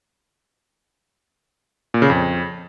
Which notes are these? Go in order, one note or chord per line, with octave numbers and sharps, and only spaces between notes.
A#2
C#3
F2